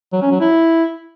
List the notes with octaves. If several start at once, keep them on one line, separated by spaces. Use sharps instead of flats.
F#3
C#4
F#3
E4